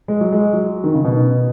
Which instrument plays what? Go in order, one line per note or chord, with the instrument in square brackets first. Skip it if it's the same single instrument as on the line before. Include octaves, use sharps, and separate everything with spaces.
[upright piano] G#3
F#3
G#3
F#3
D#3
C#3
B2